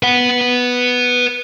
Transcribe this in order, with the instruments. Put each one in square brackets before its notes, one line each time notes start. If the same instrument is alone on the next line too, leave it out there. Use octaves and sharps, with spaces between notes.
[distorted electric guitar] B4 F#5